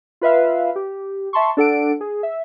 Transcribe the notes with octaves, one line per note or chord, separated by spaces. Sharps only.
F4 B4 E5 F5
G4
E5 A5 C6 C#6
D4 A4 F#5 D7
G#4
E5